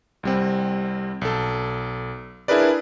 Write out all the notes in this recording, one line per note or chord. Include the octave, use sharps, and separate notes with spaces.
C2 G3 C4
B1 A4
D4 E4 G#4 A#4 B4 D5